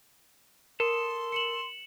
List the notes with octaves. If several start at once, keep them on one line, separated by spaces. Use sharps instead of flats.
A4 A#4 C6
C#7 E7 F#7